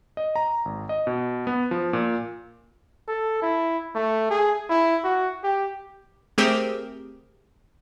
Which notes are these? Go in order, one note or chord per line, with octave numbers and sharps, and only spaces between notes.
D#5
A#5
G#1
D#5
B2
B3
F3
A#2
A4
E4
A3
G#4
E4
F#4
G4
A3 C4 G4 G#4 A#4 C5